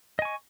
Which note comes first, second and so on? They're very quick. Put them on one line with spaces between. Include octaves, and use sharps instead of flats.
D#5 G#5 C#6